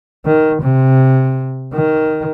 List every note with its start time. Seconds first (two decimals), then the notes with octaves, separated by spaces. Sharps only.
0.26 D#3
0.63 C3
1.73 D#3